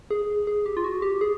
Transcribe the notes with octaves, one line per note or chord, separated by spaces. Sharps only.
G#4
G#4
G4
F4
F#4
G4
G#4